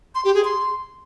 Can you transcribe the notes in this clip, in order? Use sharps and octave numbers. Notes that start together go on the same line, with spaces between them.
C6
G4
G#4
C6